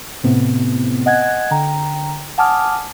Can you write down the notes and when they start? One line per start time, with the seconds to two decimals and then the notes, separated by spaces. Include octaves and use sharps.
0.24 A2 C3 B3 C4
1.06 D#5 F#5 G#5 F#6 G#6
1.51 D3 G5 A#5
2.38 F#5 G#5 A5 D6 D#6 F6